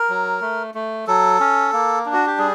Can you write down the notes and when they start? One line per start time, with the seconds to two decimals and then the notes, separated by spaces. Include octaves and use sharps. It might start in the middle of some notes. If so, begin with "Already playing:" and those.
Already playing: A#4
0.09 F#3
0.41 A3
0.74 A3
1.07 F#3 A4
1.40 C#4
1.73 A#3
2.06 D4
2.13 F#4
2.26 G4
2.38 G3 G#4